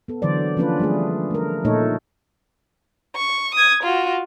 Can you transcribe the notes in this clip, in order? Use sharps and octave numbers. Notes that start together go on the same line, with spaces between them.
B3 A4
D3 E3 F#3 C5 D5
F3 A#3 C#4 D4 F4 B4
G3 A3 G#4
A3 A#4
A#2 A3 D#4 A4 C#5
C#6
D#6 G#6
F4 F#4